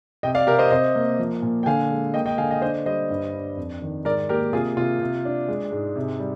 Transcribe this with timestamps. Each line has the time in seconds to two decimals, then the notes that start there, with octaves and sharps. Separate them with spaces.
0.23 C3 D#5 G5
0.35 D5 F5
0.47 C3 G4 A#4
0.59 C5 D#5
0.70 C3 C5 D#5
0.96 A#3
1.19 F3
1.42 A#2
1.63 G5
1.66 D3 F5 G#5
1.90 G#3
2.14 A#3 D#5 G5
2.26 D#5 G5
2.38 D3 F5 G#5
2.50 D#5 G5
2.62 D4 C5 D#5
2.86 G3 C5 D#5
3.10 G2
3.34 D4
3.57 F2
3.82 D#3
4.05 G#2 A#4 D5
4.29 A#3 G4 A#4
4.53 C3 F4 G#4
4.77 C3 F4
5.00 C3
5.25 D4
5.48 G#3
5.72 G#2
5.96 C3
6.20 G3